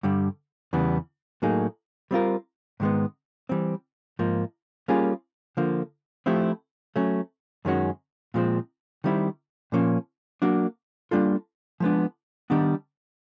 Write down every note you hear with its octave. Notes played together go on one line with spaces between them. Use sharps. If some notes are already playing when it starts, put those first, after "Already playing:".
G2 D3 G3
E2 C#3 E3 G3 B3
A2 F#3 A#3 D#4 G#4
G3 C4 F4 A#4
G#2 D#3 G#3 B3
E3 G3 C4
G#2 F3 A#3
G3 A#3 C#4 F4 G#4
D3 F3 A#3
F3 A3 C4 E4 G4
F#3 A3 C#4
F#2 D#3 G#3 C#4 F#4
A#2 F3 G#3 C4
D#3 G3 C4 E4
A#2 F3 A#3 C#4
F#3 A#3 D4 F#4
G3 A#3 D4 F4 A4
F3 G#3 B3 D4
D#3 G3 B3 D4